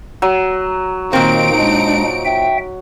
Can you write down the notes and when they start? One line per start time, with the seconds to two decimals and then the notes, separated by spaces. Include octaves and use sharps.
0.22 F#3
1.13 A#2 D#3 A#3 C4 D#4 D7
1.59 G#3 D4
2.25 E5 G5